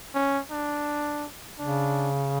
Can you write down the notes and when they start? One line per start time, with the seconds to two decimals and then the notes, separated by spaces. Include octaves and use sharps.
0.15 C#4
0.51 D4
1.59 C#3 D4